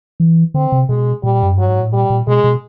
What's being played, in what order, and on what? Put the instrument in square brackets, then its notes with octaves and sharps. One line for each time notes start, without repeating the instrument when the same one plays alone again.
[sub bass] E3
[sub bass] D3 [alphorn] C4
[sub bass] C3
[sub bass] B2 [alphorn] G#3
[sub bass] A#2 [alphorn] G3
[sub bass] F#2
[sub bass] G2 [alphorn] F#3
[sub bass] G#2
A2
[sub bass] A#2 [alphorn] G3
[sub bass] A#2
[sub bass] B2 [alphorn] G#3
[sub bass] B2